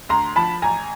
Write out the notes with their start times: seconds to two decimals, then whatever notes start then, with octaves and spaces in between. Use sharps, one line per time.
0.09 D2 A#5 C6
0.36 F3 A5 B5
0.62 A1 G#5 A#5